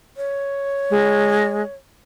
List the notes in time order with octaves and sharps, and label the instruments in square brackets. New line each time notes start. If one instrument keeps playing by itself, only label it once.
[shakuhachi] C#5
[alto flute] G#3